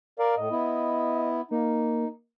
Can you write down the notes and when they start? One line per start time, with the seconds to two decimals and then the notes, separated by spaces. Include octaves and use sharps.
0.19 A#4 D5 F5
0.37 A2 D#5
0.51 B3 E4
1.51 A#3 D#4